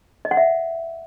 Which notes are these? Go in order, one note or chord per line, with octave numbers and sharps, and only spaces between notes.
D#5
F#5
E5